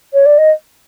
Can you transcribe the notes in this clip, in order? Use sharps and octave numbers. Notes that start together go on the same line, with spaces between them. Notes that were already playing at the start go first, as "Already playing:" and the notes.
C#5
D5
D#5